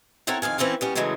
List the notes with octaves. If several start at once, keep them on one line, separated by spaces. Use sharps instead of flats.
C4 E4 A4 A#4 C#5 F#5
F2 D#3 F5 G#5
E3 C4 C#4 E4 F4
G3 B3 C#4
G#2 C#3 E3 F#3 G#3 A3